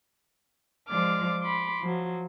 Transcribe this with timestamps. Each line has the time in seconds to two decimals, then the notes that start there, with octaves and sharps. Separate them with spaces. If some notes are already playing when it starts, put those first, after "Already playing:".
0.88 F3 G#3 D5 D6 F6
1.41 B5 C6 D6
1.83 F3 F#3